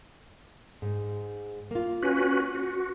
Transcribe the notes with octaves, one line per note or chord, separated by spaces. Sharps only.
G#2
A#3 F4
C#4 F#4 B4
F#4